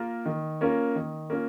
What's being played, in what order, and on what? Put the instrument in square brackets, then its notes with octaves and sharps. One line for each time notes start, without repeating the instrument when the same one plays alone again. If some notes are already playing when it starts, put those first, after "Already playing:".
Already playing: [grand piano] A#3 F4 A#4
D#3
A#3 C#4 F4 A#4
D#3
A#3 C#4 F4